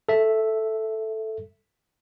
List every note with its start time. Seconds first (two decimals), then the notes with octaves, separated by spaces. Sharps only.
0.09 A4 E5